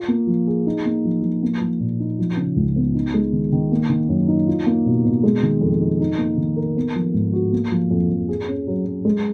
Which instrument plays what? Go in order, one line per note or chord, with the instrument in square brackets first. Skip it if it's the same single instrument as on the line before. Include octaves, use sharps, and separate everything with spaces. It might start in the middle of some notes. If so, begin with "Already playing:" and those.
Already playing: [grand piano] F4
A#3
F3
G#4
D#4
A#3
F3
F3
A#3
F3
A#2
D#4
F3
C#3
C#2
B3
D#4
G#3
D#3
D#3
A#3
D#3
F#2
D#4
F4
A#3
B2
B2
G#3
D#3
F2
D#4
D#4
A#3
D#3
A#4
B3
F3
G#2
F#4
A#3
F3
F2
F2
G#4
C#4
F#3
F#3
G#3